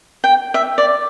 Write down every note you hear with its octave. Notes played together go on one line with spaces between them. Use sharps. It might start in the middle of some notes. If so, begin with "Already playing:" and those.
G5
E5
D5